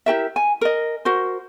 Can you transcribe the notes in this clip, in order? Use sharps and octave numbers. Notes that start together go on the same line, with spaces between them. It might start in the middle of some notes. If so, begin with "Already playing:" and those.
E4 G4 A#4 E5
G#5
A#4 D#5
F#4 A#4 C5